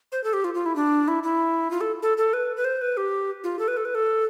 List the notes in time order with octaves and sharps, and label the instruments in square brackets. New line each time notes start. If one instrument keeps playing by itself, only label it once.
[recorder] C5
A4
G4
F4
F4
E4
D4
E4
E4
F4
A4
A4
A4
B4
B4
C5
B4
G4
F4
A4
B4
A4
B4
A4